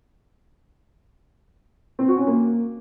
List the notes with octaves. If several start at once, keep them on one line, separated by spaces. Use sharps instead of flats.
C4
F#4
C#4
A#3